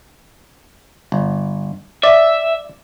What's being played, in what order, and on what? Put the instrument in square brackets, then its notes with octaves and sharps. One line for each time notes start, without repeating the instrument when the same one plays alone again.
[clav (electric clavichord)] G1
[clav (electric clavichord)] D5 [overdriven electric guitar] E5